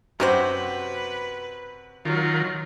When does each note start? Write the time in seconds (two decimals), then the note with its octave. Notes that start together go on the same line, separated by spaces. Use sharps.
0.20 F#2 C3 F#4 G4 B4 C5
2.05 D#3 F#3 F4 A#4